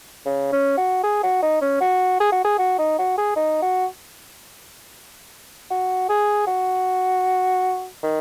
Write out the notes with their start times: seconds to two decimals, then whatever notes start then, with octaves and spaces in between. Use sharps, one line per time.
0.26 C#3
0.52 C#4
0.78 F#4
1.03 G#4
1.23 F#4
1.42 D#4
1.62 C#4
1.81 F#4
2.21 G#4
2.32 F#4
2.45 G#4
2.59 F#4
2.79 D#4
2.99 F#4
3.18 G#4
3.36 D#4
3.62 F#4
5.71 F#4
6.09 G#4
6.47 F#4
8.03 D#3